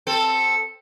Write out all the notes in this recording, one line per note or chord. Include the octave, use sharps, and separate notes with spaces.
C4 A4